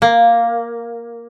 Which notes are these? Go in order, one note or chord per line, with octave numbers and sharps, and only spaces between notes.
A#3